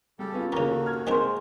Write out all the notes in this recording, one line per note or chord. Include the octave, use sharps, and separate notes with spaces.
C#3 G3 G4 A4
B3 C#4 F4
D#2 C#3 E3 A#3 F#4
A4
F6 G#6
D#3 G#3 C4 A#4 C5